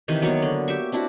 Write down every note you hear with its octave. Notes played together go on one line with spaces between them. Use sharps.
C3 D#3 E3
F#3 A#3 B3 C#5
D3
G4 E5 C#6
C4 D4 E4 F#4